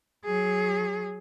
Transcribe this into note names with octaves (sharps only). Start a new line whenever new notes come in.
F#3 G#4